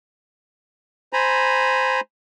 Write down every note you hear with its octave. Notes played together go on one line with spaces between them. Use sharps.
C5 G#5 A#5 B5